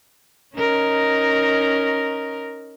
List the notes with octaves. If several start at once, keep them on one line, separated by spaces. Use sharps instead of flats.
C#4 D#4 A#4